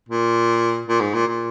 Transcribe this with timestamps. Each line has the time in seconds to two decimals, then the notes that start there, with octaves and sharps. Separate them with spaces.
0.09 A#2
0.88 A#2
1.00 G#2
1.14 A#2
1.27 A#2